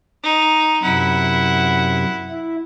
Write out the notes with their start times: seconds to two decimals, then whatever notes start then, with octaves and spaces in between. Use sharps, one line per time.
0.23 D#4
0.82 F#2 C3 E4 F#5
2.30 E4